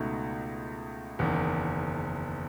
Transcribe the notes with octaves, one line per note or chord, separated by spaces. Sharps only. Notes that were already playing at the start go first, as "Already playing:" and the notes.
Already playing: C#2 B2 A3 D#4
F#1 E2 D#3